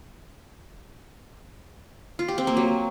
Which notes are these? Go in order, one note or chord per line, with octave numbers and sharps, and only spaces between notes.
F4
G4
C4
A#3
F#3